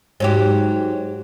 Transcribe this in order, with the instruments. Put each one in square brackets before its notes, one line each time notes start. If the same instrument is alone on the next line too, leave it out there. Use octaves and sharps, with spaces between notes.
[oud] G#2 F#3 G4